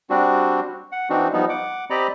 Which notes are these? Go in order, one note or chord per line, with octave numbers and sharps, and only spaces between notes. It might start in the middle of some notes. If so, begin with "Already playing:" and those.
G3 C4 D4 F#4
F#5
E3 C4 D4 D#4 F#4
F3 G3 B3 D#4
F#5 D6
C4 G4 D5 D#5 A#5 B5